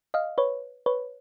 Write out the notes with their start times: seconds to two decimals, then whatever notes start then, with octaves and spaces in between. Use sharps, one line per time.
0.14 D#5 F5
0.38 B4 C#5
0.86 B4 C#5